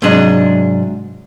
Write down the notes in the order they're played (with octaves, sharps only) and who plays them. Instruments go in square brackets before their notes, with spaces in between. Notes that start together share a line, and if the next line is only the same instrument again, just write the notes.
[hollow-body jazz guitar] G#2 C3 F#3 D4 D#5 C6